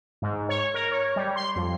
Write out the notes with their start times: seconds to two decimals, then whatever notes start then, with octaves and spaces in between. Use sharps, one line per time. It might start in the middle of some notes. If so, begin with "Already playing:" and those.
0.22 G#2
0.49 C#5
0.74 A#4
0.91 C#5
1.16 G3
1.36 C6
1.56 F2